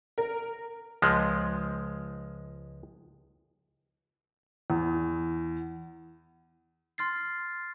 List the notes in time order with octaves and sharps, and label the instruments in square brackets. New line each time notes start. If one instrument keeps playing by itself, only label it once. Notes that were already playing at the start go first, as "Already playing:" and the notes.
[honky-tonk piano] A#4
[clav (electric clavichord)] C#2 F3 G#3
[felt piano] E2
[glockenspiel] C6 F6 A6 C7